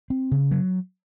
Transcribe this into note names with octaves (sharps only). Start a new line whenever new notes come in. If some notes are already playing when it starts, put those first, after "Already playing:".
C4
C#3
F#3